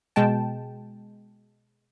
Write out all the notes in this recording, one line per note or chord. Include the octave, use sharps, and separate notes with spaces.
B2 G#3 G5 A5